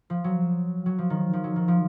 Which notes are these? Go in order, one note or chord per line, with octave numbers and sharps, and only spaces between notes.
F3
F#3
F#3
F3
D#3
F3
F#3
D#3
F3